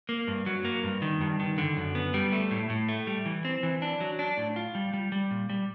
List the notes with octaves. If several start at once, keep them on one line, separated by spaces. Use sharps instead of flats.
A#3
G2
F#3
A#3
G2
D#3
G2
D#3
D3
F#2
B3
G3
A3
A2
A2
A3
G3
E3
C4
E3
D4
F#3
D4
A2
F4
G3
G3
G3
A#2
G3